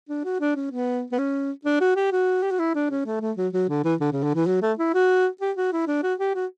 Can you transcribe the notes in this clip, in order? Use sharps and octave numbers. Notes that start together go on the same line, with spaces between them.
D4
F#4
D4
C#4
B3
B3
C#4
D4
F#4
G4
F#4
G4
F#4
E4
D4
C#4
A3
A3
F#3
F#3
D3
E3
D3
C#3
D3
E3
F#3
A3
E4
F#4
G4
F#4
E4
D4
F#4
G4
F#4